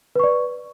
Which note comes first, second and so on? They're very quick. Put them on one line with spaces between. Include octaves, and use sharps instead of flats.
B4 C#6 D5